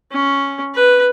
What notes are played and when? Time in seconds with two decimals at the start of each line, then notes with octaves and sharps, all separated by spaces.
0.12 C#4
0.75 B4